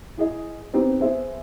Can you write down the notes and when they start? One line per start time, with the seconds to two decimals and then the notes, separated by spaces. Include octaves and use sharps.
0.17 E4 G#4 D#5
0.74 B3 C4 D#4 G4
1.00 B3 G#4 C5 E5